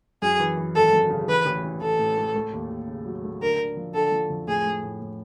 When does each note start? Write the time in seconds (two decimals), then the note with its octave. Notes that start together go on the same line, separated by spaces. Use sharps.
0.22 F#2 G#4
0.40 E3
0.57 E3
0.75 G#1 A4
0.93 F#2
1.10 C#3
1.28 E3 B4
1.46 A1
1.64 E3
1.81 E3 A4
1.99 A2
2.17 A3
2.35 A3
2.53 D#2
2.71 D#2
2.87 C#3
3.06 F#3
3.23 A3
3.41 D3 A#4
3.59 D3
3.77 F3
3.94 D3 A4
4.12 F3
4.30 F2
4.47 A2 G#4
4.65 A3
4.83 A2
5.01 A2